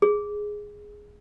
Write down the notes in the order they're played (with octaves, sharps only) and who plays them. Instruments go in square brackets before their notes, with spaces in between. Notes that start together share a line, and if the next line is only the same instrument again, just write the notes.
[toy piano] G#4